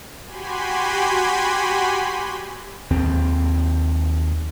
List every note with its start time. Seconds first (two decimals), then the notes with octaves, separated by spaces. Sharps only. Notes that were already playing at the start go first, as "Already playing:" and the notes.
0.26 F#4 G4 G#5 B5 C6
2.90 D#2 C4